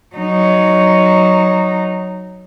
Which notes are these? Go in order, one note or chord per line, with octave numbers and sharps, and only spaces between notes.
F#3 D#4